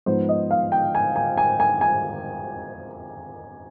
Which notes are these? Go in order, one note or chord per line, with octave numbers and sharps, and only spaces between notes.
G#2 F3 B3 D#4 C5
D#5
F5
G5
G#5
G#5
G#5
G#5
G#5